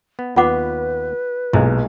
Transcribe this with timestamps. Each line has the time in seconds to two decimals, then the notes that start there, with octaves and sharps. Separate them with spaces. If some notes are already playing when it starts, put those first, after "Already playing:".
0.19 B3
0.36 D#2 B3 F4 B4 F#5 D6
1.53 B1 A#2 G#3 A#3 E4